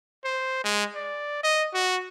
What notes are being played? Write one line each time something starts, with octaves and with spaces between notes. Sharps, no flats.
C5
G#3
D5
D#5
F#4